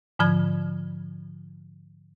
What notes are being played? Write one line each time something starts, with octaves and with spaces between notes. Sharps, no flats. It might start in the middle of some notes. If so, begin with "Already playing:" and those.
G#2 D3 F3 B5 G#6